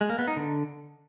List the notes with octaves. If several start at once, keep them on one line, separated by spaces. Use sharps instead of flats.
G#3
A#3
B3
D#4
D3